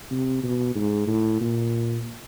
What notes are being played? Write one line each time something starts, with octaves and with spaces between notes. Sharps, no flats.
C3
B2
G#2
A2
A#2